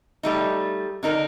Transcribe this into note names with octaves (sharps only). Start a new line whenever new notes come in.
G3 A3 D#4
D3 D#4 A#4